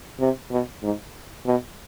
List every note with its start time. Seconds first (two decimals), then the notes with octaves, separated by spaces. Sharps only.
0.20 C3
0.51 B2
0.83 G#2
1.46 B2